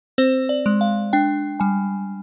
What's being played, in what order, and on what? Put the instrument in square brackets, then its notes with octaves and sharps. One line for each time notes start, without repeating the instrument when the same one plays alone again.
[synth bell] C4 C5
D5
G#3
F5
D4 G5
G3 G#5